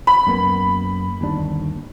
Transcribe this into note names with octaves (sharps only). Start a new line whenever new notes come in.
B5
F#2 A#3 B3
G1 D#2 D4